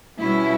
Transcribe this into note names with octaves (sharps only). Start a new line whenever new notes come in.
B2 G3 C#4 E4